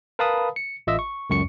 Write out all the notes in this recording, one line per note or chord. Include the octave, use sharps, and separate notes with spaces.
A#4 B4 F5 A5 B5 D#6
C#7
A1 F4 D#5 E5 E6
C#6
C#2 F#2 C#6 C#7